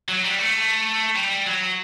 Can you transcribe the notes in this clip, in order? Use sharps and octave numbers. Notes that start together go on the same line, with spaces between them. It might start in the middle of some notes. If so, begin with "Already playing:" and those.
F#3
G3
A3
G3
F#3